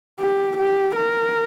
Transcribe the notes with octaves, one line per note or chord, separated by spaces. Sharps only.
G4
G4
A#4